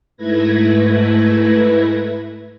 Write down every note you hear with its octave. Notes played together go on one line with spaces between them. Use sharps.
G#2 A3 E4 B4 G#6 A#6